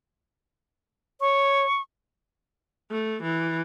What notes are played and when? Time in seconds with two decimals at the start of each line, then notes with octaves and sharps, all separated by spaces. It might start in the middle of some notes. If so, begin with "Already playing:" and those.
1.21 C#5 C#6
2.91 A3
3.23 E3